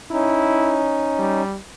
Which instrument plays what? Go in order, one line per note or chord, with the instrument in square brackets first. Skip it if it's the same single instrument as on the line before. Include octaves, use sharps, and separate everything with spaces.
[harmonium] C#4 D#4 [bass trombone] E4
[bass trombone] G3